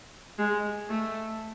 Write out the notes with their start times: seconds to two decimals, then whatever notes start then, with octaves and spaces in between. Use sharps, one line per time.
0.38 G#3
0.89 A3